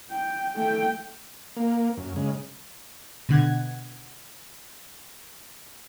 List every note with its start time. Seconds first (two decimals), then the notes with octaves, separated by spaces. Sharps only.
0.11 G5
0.57 A3 G5
1.56 A#3
1.97 F#2
2.16 C#3 G#3
3.29 B2 D3 F#5 G#6